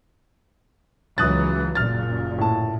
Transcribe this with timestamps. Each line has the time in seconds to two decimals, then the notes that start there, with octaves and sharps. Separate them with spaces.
1.18 C#2 E3 F#3 D#6 F#6 A6
1.75 F#1 A#2 F6 A6
2.38 A2 A5